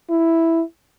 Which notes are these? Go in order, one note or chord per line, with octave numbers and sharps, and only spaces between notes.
E4